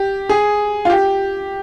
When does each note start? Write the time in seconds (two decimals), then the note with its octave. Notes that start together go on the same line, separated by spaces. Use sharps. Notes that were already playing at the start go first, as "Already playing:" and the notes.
Already playing: G4
0.29 G#4
0.85 F4
0.90 G4